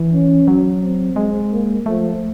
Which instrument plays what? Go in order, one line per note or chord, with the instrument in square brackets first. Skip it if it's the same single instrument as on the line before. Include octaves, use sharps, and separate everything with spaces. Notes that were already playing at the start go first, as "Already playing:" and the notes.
Already playing: [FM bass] E3
[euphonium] C#4
[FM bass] F#3
[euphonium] C4
[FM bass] G#3
[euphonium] A#3
[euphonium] F3 [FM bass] A3